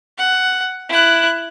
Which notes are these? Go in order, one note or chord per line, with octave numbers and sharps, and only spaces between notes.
F#5
E4 F#6